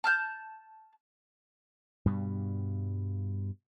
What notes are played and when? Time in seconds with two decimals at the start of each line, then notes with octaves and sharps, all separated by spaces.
0.04 A5 F6 G6
2.06 G2 B2 G3